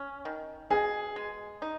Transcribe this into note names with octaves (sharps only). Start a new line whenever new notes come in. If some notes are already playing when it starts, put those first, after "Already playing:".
Already playing: C#4
D#3
B2 G#4
G#3
D#4